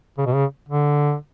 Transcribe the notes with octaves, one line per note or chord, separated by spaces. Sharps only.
C#3
B2
C#3
D3